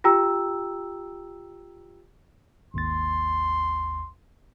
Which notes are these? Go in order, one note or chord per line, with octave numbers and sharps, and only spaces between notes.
F4 G4 G5 A#5 E6
G#1 D#2 C6 A6